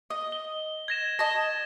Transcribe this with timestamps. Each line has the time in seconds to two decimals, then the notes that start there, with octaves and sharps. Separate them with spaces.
0.10 D#5
0.32 G7
0.88 G#6 A#6 E7
1.19 D#5 A5 A#6